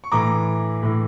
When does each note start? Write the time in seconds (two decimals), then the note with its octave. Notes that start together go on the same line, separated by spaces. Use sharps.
0.04 C#6
0.12 A2 E3 A#5 D6
0.83 A2 E3